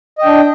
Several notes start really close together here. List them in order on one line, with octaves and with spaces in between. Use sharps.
D#5 G5 D4